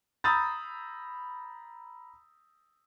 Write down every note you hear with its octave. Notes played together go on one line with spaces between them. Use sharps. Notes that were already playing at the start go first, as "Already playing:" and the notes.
A#5 B5 D#6 E6 G6 A6